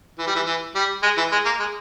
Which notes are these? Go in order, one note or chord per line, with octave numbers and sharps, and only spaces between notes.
E3
G3
E3
E3
G3
G#3
E3
G#3
A#3
G#3